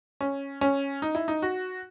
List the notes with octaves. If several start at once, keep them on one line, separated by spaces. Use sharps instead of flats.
C#4
C#4
D#4
E4
D#4
F#4